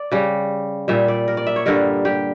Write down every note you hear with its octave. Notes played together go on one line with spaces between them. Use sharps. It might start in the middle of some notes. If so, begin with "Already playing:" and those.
Already playing: D5
C#3 G3
A#2 G3 E5
D5
A#4
D5
E5
C#5
G2 D3 G3 A#4
G4